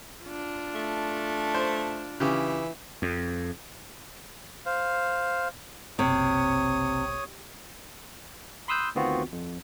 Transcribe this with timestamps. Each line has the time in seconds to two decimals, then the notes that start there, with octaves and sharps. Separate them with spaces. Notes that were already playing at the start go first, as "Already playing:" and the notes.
0.24 D4 F4
0.75 A3
1.54 C5
2.20 C#3 E3 G4
3.02 F2
4.66 C5 F5
5.99 F#1 B1 C3 C#5 D#6
8.68 B5 C6 D#6 E6 F#6 G6
8.95 D2 D#3 B3 C4 F4 F#4
9.32 F2